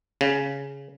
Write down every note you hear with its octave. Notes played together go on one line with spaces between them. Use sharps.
C#3